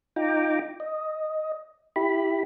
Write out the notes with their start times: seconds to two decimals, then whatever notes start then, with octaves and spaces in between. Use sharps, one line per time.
0.16 D#4 F4 G5 A#5 D6
0.80 D#5
1.96 E4 G4 B5